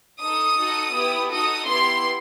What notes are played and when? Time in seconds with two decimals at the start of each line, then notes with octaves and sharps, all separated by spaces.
0.20 D#4 A4 D#6
0.57 D#4 F#4 A4
0.93 B3 E4 G4
1.31 D#4 F#4 A4 D#6
1.68 B3 E4 G4 C6